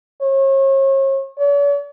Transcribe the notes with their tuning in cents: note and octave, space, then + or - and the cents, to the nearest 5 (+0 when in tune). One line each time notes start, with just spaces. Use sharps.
C#5 -40
C#5 +45